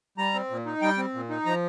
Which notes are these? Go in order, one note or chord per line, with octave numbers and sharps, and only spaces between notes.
G3 A#5
C4
A#2
D#4
G3 G5
C4
A#2
D#4
F3 A#5